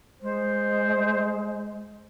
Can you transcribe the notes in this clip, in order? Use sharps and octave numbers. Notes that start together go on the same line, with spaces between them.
G#3 C5